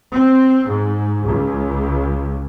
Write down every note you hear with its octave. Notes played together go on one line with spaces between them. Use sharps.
C4
G#2
C#2